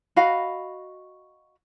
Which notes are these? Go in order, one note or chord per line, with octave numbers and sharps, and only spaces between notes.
F#4 D#5 F5 B5